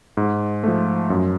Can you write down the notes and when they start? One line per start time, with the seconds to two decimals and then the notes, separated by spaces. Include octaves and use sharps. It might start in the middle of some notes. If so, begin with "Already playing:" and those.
0.17 G#2
0.63 F3 A3
1.10 F#2